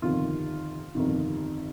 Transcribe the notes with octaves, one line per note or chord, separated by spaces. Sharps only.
G1 F2 C3 D#3 F4
G1 F2 C3 D#3